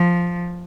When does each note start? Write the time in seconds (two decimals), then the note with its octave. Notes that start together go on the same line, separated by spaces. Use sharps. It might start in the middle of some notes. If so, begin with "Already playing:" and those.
Already playing: F3